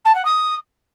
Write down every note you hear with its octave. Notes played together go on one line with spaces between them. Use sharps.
A5
F#5
D#6